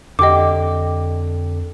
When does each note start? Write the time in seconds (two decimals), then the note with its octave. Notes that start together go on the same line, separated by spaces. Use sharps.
0.19 F2 D3 G4 D#5 D6